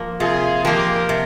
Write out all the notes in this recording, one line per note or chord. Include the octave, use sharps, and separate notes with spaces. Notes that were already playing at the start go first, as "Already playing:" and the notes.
Already playing: F3 A#3
C3 F4 G#4
F3 A#3 G4 A#4
C3